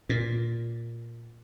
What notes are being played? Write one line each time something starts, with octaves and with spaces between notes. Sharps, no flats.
A#2